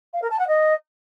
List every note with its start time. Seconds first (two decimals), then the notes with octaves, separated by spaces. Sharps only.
0.13 F5
0.22 A#4
0.31 A5
0.39 F#5
0.48 D#5